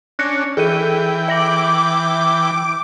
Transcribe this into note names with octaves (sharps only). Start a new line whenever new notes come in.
C#4 D4 F#6 A#6 C#7
E3 G#4 A4 G5 D#7
E5 D6 A#6 F#7